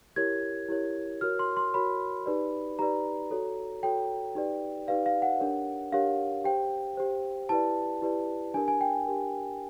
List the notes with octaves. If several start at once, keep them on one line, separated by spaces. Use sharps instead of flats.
E4 G4 A#4 C#5 G#6
E4 G4 A#4 C#5
F#4 A#4 C#5 F6
C6
C6
F#4 A#4 C#5 B5
D#4 G4 B4 D5
D#4 G4 B4 D5 A#5
F#4 A4 C#5
F#4 A4 C#5 G5
D#4 G4 B4 D5
D#4 G4 B4 D5 F5
F5
F#5
D4 G4 A#4 C#5
D4 G4 A#4 C#5 F5
G4 C5 G5
G4 C5
E4 G4 B4 D5 A5
E4 G4 B4 D5
D4 G4 A#4 G#5
G#5
G5
D4 G4 A#4